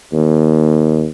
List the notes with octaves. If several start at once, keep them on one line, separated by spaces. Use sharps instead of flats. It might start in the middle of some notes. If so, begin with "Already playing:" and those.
D#2